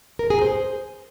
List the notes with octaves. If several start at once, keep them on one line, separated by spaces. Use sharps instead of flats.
A#4
G#4
C5